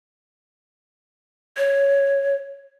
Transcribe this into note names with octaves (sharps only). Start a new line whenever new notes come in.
C#5